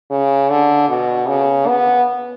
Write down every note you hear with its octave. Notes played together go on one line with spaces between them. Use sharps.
C#3
D3
B2
C#3
B3